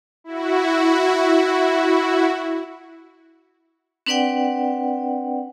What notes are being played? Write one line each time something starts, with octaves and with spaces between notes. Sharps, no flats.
E4 F#4
C4 D4 B4 D5 F#5 G5